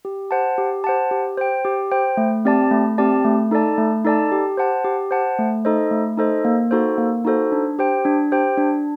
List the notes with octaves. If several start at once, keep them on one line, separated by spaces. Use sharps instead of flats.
G4
C5 F#5 A5
G4
C5 F#5 A5
G4
C5 G5
G4
C5 G5
A3
C4 G4 D5 A5
A3
C4 G4 D5 A5
A3
D#4 A4 D5 A5
A3
D#4 A4 D5 A5
G4
C5 F#5 A5
G4
C5 F#5 A5
A3
D#4 A4 C5 D#5
A3
D#4 A4 C5 D#5
A#3
D#4 F#4 A4 C5
A#3
D#4 F#4 A4 C5
D4
G4 C5 G5
D4
G4 C5 G5
D4